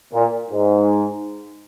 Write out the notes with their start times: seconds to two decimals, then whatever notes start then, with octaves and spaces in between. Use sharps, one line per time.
0.13 A#2
0.51 G#2